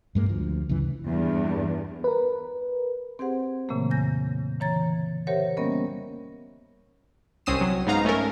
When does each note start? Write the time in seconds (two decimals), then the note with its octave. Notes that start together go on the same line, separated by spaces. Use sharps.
0.15 G2 G#3 A#3
0.29 D2 F3
0.69 C#2 F#2 C#3 E3
1.06 E2 G2
2.04 A#4 B4
3.19 C4 G4 G#4 C5 F#5
3.69 A#2 C#3 E3 F#3 A3 A#3
3.90 F2 C#3 G#5 G6 A#6
4.60 D3 E3 C#5 A#5 G#6 A6
5.27 G4 A#4 C5 C#5 E5 F#5
5.57 G3 A#3 B3 C#4 A#4 D#5
7.46 C2 C4 C#4 D#6 C7 E7
7.61 F#3
7.87 G#2 B3 D#4 F5 A#5
8.05 A3 C#4 A4 A#4